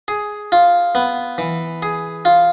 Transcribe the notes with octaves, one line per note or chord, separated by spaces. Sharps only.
G#4
F4
B3
E3
G#4
F4